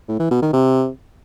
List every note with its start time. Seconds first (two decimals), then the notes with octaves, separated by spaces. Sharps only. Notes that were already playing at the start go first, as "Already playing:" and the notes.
0.08 A2
0.19 E3
0.31 B2
0.42 D#3
0.53 C3